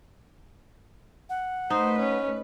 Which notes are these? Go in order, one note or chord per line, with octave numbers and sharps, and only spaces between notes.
F#5
A3 D#4 B4 C5
C#4